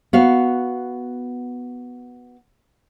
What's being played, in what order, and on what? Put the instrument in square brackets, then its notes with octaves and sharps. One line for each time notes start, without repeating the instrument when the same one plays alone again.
[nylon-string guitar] B3 F#4 F5